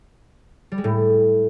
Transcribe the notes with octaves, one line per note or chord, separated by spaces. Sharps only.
G3
G#3
A2